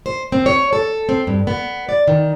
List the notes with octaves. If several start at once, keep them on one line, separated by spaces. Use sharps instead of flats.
C5
C4
C#5
A4
C4
G2
B3
D5
D#3